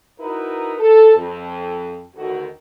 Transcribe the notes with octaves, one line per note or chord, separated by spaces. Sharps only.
D#4 E4 F#4 A#4 B4
A4
F2
D2 D3 D#3 F#4